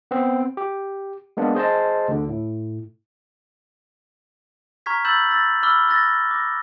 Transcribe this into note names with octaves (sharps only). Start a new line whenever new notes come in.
B3 C4
G4
G#3 A#3 B3 D4
G#4 C5 D#5 A5
D2 D3
A2
A#5 C#6 F6 G#6 B6
B5 E6 G6 A6 E7 F#7
E6 A6 A#6
B5 D6 E6 F6 G7
E6 F#6 A6 A#6
D6 A#6